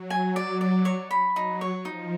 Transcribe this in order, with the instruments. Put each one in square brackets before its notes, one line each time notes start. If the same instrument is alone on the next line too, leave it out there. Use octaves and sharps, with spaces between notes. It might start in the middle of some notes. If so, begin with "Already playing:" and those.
Already playing: [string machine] F#3
[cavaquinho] G#5
D5
D5
C#5
B5
[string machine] F#3 [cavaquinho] D#4
[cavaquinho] C#5
[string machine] F3 [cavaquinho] D#4